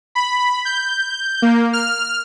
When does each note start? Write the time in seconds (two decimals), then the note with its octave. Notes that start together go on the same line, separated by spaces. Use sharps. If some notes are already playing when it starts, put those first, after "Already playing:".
0.15 B5
0.65 G6
1.42 A#3
1.73 F6